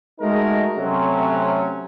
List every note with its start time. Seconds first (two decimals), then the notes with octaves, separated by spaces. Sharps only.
0.20 G#3 A3 D#4 F#4 A#4
0.77 C3 F#3 A3 C4 C#4